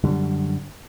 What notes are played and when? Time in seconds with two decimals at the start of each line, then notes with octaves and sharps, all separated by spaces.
0.04 F#2 D3 G3